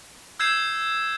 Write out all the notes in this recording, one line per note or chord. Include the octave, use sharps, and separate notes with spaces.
E6 G6 G#6 C7 E7